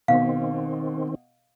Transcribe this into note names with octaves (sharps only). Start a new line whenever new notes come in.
B2 D#3 C4 F5